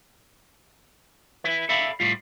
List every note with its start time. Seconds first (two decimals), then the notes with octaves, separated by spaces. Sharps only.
1.44 E4 B4
1.69 A4 D5 E5 F5 B5
2.00 A2 G3 F4